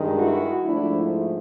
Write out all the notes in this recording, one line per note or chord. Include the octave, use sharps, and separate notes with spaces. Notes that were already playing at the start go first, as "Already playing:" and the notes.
Already playing: G2 D#3 G#3
E4 F#4
G#2 F3 A3 D4 E4